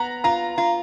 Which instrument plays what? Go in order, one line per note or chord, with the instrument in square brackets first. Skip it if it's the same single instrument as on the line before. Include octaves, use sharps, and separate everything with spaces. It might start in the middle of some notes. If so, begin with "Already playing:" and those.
Already playing: [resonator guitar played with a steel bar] B3 [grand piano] A#5
[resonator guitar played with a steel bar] F4 [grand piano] A#5
[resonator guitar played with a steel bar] F4